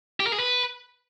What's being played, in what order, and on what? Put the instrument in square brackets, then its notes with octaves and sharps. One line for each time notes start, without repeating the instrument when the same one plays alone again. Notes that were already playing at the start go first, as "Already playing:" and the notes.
[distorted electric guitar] G4
A#4
G#4
B4